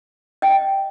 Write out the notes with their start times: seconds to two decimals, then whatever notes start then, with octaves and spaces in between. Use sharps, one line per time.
0.42 D#5 G5